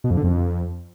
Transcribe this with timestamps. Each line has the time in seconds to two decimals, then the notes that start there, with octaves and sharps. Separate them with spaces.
0.04 B2
0.11 F2
0.17 D3
0.24 F2